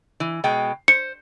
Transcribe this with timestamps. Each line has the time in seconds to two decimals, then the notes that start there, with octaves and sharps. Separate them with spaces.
0.20 E3
0.44 B2 G#3 G5
0.88 C5 C#7